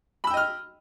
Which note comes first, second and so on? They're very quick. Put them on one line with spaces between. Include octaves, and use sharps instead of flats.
B5 E6 G5 D#5 F6